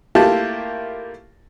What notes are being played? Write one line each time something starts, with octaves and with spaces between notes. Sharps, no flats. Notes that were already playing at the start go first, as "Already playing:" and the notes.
A3 A#3 E4 F4 G4 A5